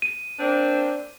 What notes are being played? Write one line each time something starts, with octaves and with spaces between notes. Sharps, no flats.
D#7
A#3 C4 D4